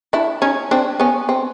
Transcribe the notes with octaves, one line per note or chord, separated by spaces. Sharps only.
D4 E4
C#4 D#4
C4 D4
B3 C#4
C4